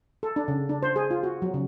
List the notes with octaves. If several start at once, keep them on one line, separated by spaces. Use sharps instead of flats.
A4
D4
C#3
D4
C5
G#4
F4
F#4
F#3
C#3